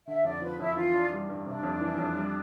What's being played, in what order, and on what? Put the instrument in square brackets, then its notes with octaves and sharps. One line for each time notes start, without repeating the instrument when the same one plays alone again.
[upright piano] D3 [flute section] E5
[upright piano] F2 [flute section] D5
[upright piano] F3 [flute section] B4
[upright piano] F2 [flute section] E4
[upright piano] E3 [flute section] F4
[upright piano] D4
G3
G2
[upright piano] C3 [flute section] D4
[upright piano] F2
E3
F2
G3